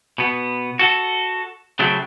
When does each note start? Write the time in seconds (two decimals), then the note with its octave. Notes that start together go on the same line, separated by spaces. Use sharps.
0.18 B2 B3
0.79 F#4 A4
1.79 C#3 F#3 A3 C4